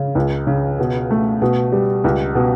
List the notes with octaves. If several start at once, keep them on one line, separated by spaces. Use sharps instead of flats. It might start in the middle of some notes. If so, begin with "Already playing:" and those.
Already playing: C#3
C#2
C#3
B2
A3
B2
G3
C#2
B2